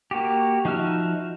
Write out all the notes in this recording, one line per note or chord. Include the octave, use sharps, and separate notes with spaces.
A#3 F#4 G4
F3 D#4 F#4 E5 F6